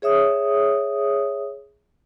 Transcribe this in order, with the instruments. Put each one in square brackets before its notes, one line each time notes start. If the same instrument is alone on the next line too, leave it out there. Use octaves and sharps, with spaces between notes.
[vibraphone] G#4 C#5 E5 D#6